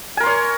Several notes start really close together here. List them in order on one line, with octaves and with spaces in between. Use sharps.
G#5 A#4 C6 C#5